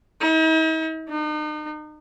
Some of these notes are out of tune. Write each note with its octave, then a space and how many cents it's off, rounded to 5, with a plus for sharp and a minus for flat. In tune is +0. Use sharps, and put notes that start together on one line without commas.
D#4 +45
D#4 -40